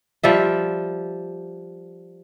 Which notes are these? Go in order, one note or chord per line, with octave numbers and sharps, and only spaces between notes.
F3 G3 E5